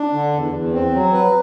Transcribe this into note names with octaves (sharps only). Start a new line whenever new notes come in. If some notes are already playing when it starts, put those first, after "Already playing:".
Already playing: D4
D3
E2
E2
C4
F#3
B4